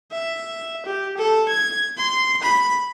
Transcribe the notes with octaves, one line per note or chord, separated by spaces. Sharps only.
E5
G4
A4
G#6
C6
B5